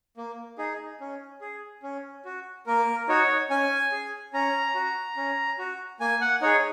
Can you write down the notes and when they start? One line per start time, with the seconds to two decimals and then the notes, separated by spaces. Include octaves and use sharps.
0.17 A#3
0.58 D#4 G#4
1.00 C#4
1.41 G#4
1.83 C#4
2.25 F#4
2.66 A#3 A#4
3.08 D#4 F#4 C#5
3.50 C#4 G#5
3.92 G#4
4.33 C#4 A#5
4.75 F#4
5.17 C#4
5.58 F#4
6.00 A#3 G#5
6.21 F#5
6.42 D#4 G#4 C#5